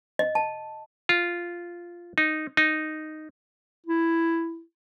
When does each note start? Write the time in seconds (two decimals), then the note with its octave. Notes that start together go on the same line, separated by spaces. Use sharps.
0.19 D#5
0.35 A5
1.09 F4
2.18 D#4
2.57 D#4
3.86 E4